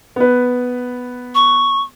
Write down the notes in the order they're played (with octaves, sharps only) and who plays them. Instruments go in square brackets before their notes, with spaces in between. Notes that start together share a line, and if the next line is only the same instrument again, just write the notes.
[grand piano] B3 B4
[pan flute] C#6